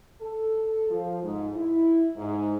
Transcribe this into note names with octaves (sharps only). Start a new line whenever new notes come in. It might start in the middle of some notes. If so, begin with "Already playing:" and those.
A4
F3
G#2
E4
G#2